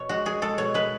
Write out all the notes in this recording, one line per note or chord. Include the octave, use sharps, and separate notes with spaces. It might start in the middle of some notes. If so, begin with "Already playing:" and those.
Already playing: B2 C#5
G#3 F#4
B2 G#4
G#3 A4
B2 C#5
G#3 B4